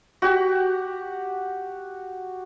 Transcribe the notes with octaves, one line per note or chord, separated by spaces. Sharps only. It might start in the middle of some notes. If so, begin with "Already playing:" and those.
F#4 G4